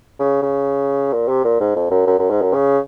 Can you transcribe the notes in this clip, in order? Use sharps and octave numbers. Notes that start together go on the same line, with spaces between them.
C#3
C#3
A#2
C3
A#2
G#2
F2
F#2
F#2
F#2
G#2
F#2
C#3